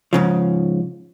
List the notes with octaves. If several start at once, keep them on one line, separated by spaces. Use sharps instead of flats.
G#2 C#3 F3